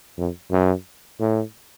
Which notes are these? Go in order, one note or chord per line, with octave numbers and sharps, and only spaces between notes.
F2
F#2
A2